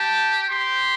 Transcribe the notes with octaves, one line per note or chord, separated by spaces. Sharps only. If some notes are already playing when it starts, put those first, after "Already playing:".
Already playing: G4 A5
G4 C6